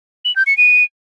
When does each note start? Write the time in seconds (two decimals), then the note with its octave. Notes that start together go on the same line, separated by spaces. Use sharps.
0.25 F#7
0.36 G6
0.47 C#7
0.58 D#7